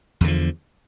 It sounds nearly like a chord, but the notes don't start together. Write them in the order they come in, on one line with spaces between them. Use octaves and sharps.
E2 D3 F3